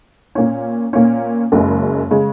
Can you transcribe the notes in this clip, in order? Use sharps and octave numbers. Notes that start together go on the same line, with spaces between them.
A#2 A#3 C#4
A#2 A#3 C#4
F#1 F#2 C#3 G#3
C#3 G#3